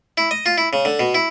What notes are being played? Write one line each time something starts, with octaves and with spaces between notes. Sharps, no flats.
E4
D#5
F4
E4
C#3
D3
B2
E4